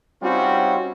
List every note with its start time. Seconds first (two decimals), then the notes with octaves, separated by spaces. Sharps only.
0.23 G3 C4 C#4 D#4 F4 F#4